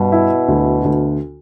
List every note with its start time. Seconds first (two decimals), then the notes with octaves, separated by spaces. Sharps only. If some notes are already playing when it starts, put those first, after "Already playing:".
Already playing: G2 B2
0.12 E4
0.48 D2
0.84 D2